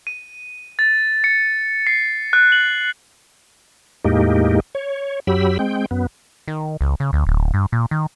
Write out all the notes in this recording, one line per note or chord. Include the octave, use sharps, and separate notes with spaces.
D#7
A6
C#7
C7
F#6
F#7
E2 A2 G#3 A#3 D#4 G4
C#5
F#2 F#3 G4 B5 E6
G#3 C4 G5
F#2 B3
D#3
C#2
C#3
D2
D1
G2
A#2
D#3